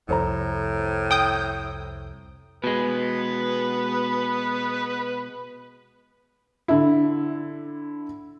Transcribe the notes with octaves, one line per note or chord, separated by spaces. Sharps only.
C2 F2 A2 A4 C5 A#5
G5 D#6 G6
B2 G#3 B3 B4
D3 E4